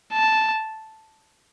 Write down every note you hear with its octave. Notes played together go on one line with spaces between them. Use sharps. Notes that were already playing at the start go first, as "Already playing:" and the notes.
A5